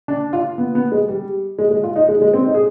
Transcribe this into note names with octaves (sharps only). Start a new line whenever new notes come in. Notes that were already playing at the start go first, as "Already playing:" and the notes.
D4
F4
B3
B3
G#3
G3
G#3
G#3
F4
D#4
G#3
G#3
C4
D#4
G#4